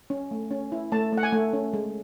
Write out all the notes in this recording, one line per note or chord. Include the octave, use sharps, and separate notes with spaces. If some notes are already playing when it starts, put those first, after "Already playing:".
C#4
A3
C#4
E4
A3 A5
A3
F#5
G#5
A3
C#4
G#3